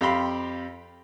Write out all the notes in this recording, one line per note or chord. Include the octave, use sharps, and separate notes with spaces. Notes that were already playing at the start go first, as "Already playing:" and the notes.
F2 G4 F5 G5 B5 C6